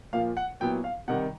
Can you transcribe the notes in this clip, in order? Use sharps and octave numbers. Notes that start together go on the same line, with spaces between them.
A#2 F3 A#3 F5
F#5
A#2 F#3 B3 E4 G5
F5
C3 D#3 G3 F#5